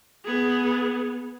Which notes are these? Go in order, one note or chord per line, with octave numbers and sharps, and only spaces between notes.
B3 G#4